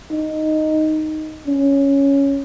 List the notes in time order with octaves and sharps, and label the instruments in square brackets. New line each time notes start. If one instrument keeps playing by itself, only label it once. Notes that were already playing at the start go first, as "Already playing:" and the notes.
[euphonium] D#4
C#4